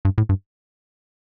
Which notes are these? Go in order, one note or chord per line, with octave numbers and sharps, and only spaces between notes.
G2
A2
G2